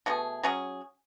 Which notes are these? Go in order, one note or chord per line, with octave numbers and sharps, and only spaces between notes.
B2 A3 D4 G#4
F#3 C#4 G#4